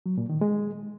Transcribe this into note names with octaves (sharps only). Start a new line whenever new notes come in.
F#3
A#2
D#3
G#3